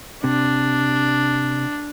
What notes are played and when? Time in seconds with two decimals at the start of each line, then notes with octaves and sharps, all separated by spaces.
0.24 C3 D4